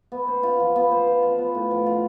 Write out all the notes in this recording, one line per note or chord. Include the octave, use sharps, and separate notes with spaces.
B3
C5
F4
F3
B3
C5
F3
F4
B3
A2
F3
F4